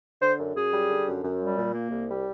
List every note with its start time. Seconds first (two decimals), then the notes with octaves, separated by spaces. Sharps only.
0.21 D3 C5
0.39 F#2
0.56 F#2 G#4
0.73 G3
0.89 D3
1.06 F#2
1.23 F#2
1.40 G3
1.57 A#2
1.74 A#3
1.91 C2
2.08 G3